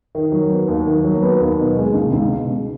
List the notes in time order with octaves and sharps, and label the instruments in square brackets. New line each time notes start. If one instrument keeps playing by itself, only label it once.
[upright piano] D#3
F#3
B3
D#2
D#3
F#3
B3
D#2
B2
G#3
C#2
C#2
B2
G#3